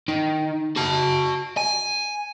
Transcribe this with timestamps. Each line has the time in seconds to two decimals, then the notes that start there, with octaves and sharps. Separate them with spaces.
0.08 D#3
0.76 F#4 A5
1.58 G#5